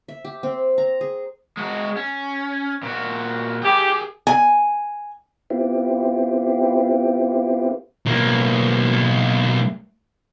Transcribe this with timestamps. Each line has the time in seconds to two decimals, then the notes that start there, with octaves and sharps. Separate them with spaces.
0.08 E5
0.25 G4
0.43 C4
0.78 A#5
1.01 G#4
1.57 G#3 F#4
1.96 C#4
2.82 A#2 F#4
3.63 G4 G#4 G5
4.27 G#5
5.50 B3 C4 E4 F4 G4
8.06 B1 A#3